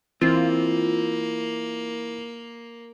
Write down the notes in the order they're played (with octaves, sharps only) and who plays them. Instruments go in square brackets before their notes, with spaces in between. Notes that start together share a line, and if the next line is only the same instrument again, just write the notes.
[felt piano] E3 [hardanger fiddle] A#3 [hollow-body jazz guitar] C4 [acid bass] F4